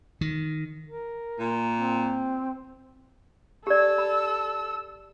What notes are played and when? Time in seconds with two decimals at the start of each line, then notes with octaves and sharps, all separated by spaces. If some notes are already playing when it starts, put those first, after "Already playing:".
0.21 D#3
0.86 A#4
1.39 A#2
1.76 C4
3.67 G4 A4 D5 E6
3.98 B5